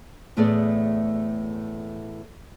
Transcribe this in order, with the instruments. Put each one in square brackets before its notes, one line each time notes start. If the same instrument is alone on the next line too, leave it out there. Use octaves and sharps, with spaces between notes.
[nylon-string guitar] E2 A2 A3 B3 G#4 D5